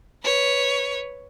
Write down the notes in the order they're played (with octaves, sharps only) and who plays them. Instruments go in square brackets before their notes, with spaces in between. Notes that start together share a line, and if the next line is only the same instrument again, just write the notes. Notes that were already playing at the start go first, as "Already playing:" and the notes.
[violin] B4 C#5